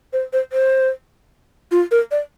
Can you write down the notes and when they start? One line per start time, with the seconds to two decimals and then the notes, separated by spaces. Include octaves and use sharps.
0.13 C5
0.33 C5
0.53 C5
1.72 F4
1.91 A#4
2.11 D5